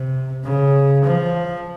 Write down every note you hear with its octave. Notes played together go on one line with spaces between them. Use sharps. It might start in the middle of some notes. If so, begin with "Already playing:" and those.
Already playing: C3
C#3
F3